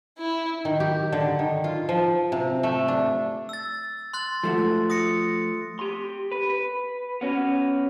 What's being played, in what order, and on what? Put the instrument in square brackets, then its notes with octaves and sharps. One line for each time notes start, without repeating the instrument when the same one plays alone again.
[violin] E4
[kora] D#3
G4
D3
D#3
F4
F3
C3
A3
D4
[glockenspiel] E6 A6
C6 F#6 A6
[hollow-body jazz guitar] F3 A3 F#4
[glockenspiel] D#6 A#6 C#7
[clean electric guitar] G4 C6
B4
B4
B3 C#4 F#4